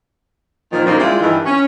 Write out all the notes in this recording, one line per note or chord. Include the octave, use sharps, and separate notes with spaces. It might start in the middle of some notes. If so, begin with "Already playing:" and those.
A#2 D#3 F3
F#2 A#2 D3 F3 A#3 D#4
G3 G#3 E4 F4
G2 D#3 E3
C#4